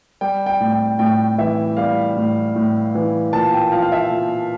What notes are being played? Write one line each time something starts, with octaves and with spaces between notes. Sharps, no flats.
G3 G5
G5
A2
G5
A2 G5
E3 E5
G3 F5
A2
A2
E3
A#2 A5
G5
F3 F5
F5
E5
A#2